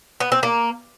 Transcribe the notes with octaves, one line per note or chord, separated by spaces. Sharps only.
B3
C4
A#3